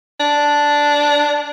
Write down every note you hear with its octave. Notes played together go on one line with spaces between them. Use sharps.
D4